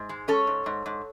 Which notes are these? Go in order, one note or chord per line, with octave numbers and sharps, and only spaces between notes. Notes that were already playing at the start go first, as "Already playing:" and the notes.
Already playing: G#2
G#3
C#4 A4 C#5
G#2
G#2
G#2